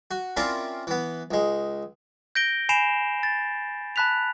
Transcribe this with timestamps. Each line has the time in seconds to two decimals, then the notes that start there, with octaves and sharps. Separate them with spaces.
0.11 F#4
0.37 C4 C#4 E4 F4 A#4 D5
0.87 E3 B3
1.31 C#2 G#3
2.35 G6 A#6 D7 G7
2.69 G#5 B5 C7 D7 E7 F7
3.23 A6
3.96 A5 B5 F#6 B6 F7